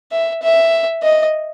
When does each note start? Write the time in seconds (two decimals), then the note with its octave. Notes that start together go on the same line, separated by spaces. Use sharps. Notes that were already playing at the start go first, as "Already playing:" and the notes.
0.12 E5
0.43 E5
1.03 D#5